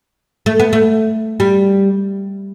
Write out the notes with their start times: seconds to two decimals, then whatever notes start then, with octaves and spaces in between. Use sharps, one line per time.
0.46 A3
0.60 B3
0.73 A3
1.40 G3